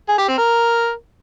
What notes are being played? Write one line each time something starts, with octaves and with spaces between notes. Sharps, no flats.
G#4
G4
C4
A#4